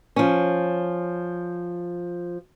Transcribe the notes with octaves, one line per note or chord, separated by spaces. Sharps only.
F3 C#4